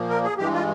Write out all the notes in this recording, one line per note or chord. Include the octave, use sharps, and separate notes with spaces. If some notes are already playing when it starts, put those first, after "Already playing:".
Already playing: A#2 F3 A#3
A#4
G#4
G2 E3 G#3 G4
F4